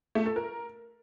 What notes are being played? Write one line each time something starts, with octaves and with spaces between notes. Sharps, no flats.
A3
A4
A#4